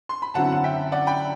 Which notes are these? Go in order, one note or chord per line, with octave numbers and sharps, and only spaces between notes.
C6
B5
F#2 D3 F#3 C4 E4 F#5 A5
F#5
E5 G5
D5 F#5
G5 B5